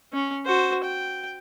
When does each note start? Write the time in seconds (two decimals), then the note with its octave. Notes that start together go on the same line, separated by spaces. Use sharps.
0.13 C#4
0.46 F#4 C5
0.84 G5